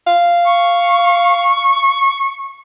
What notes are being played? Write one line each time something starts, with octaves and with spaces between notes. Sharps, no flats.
F5
C#6